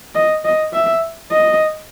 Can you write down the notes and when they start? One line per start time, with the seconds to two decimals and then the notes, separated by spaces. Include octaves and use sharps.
0.15 D#5
0.45 D#5
0.73 E5
1.31 D#5